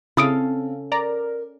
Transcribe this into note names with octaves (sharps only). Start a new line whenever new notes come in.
C#3 C4 C#4 E4 A4 F5 D#6 D7
A#4 D5 A#5